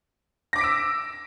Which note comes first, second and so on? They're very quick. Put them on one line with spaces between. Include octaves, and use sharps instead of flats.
A#6 D6 B6 D7 E6